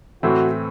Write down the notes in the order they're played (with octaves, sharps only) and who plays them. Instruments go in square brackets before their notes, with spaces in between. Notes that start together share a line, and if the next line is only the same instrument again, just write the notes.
[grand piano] A2 E3 A3 C4 [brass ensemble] F#4